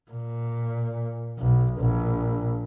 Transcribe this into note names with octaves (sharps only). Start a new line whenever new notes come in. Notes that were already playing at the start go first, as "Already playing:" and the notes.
A#2
B1
A#1